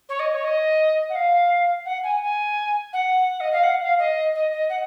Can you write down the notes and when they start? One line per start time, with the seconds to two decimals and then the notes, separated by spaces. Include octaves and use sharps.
0.09 C#5
0.19 D#5
0.32 C#5
0.44 D#5
1.09 F#5
1.15 F5
1.85 F#5
2.03 G#5
2.21 G#5
2.93 F#5
3.40 D#5
3.52 F5
3.63 F#5
3.81 F5
3.98 D#5
4.35 D#5
4.52 D#5
4.69 F#5